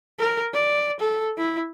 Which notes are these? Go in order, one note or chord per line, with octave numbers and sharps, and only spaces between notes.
A#4
D5
A4
E4